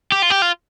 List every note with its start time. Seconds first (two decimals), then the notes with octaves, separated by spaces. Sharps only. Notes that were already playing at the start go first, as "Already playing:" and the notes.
0.12 G4
0.22 F4
0.30 G4
0.42 F4